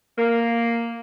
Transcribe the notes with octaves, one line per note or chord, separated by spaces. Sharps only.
A#3